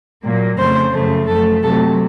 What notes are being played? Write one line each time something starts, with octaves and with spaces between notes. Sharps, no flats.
A#2 F#3 A#3
F2 C#3 A3 C5
F#2 C#3 F3 A3
F#2 F3 A3 A4
C3 F#3 A3 A4